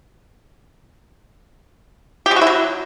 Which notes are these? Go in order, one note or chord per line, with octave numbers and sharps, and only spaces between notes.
G4
G#3
F#4
E4
F#3